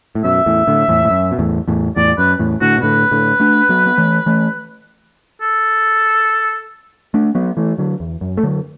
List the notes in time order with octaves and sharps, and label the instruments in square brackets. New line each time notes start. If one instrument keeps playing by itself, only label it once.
[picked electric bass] A2
[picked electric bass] F#2 B2 [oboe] E5
[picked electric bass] E2 A2
A2 D3
E2 A2
A2
F#2
B2
E2 A2
E2 A2
[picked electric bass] E2 A2 [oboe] D5
[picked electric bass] F#2 [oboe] B4
[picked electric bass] E2 A2
[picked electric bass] A2 D3 [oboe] F#4
[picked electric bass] B2
[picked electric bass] A2 D3 [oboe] B4
[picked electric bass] A2 D3
A3 D4
F#3 B3
B3
E3 A3
E3 A3
[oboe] A4
[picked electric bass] A3 D4
F#3 B3
E3 A3
D3 F#3
E2
F#2
A3
D3 F#3